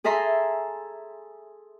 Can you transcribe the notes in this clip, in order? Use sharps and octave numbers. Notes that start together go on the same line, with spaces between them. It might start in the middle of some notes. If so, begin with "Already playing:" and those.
G#4 A4 E5 A#5 C6